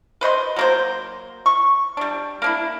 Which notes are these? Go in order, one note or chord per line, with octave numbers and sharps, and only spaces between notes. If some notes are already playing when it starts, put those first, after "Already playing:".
B4 C5 D#5 C6
F#3 A#3 C5
C#6
G3 D4
A#3 D4 E4